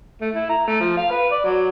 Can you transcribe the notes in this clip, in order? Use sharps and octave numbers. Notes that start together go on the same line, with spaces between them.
A3
E4
A#5
A3
F3
F5
B4
D5
F#3